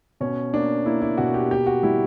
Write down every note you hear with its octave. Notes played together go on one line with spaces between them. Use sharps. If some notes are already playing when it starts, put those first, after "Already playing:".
B2 C#4
A#3 D4
A#3 E4
E4
B2 F#4
G4
A#3 G4
F#4
G3 E4